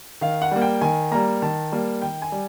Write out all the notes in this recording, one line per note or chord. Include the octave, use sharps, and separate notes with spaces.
D#3 F5
F#5
G3 A#3
G5
D#3 G#5
G3 A#3 A#5
D#3 A5
G3 A#3
D#3 G5
G#5
G3